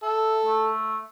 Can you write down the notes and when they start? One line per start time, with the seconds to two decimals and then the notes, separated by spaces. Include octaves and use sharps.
0.03 A4 E5
0.45 A3